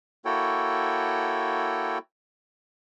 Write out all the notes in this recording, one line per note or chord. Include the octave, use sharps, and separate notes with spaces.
A#3 E4 F#4 A4 C#5 G5